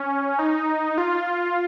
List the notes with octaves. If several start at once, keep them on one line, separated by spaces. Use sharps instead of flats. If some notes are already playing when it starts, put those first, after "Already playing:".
Already playing: C#4
D#4
F4